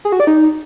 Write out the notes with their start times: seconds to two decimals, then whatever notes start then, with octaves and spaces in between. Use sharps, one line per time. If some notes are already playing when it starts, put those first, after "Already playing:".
0.05 G#4
0.12 F#4
0.20 D5
0.27 D#4